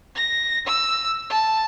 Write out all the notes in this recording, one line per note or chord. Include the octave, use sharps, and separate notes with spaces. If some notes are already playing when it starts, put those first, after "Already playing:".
A#6
E6
A5